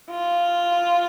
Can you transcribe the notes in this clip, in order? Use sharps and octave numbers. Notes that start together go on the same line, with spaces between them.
F4